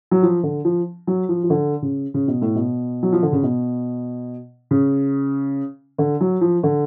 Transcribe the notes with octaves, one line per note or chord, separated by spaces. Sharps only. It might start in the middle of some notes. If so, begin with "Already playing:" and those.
F#3
F3
D3
F3
F#3
F3
F3
D3
C#3
C#3
B2
A2
B2
F#3
F3
D3
C#3
B2
C#3
D3
F#3
F3
D3